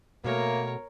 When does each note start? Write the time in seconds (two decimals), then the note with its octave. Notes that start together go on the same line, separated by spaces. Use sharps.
0.24 B2 A3 A#3 A#4 C#5